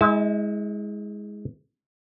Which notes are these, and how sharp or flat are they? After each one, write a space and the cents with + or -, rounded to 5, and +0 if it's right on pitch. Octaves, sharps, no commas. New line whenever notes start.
G#3 +0 E4 -35 A5 -35